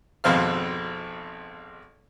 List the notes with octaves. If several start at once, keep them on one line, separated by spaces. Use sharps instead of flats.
G#1 F2 B2 C4 F5 F6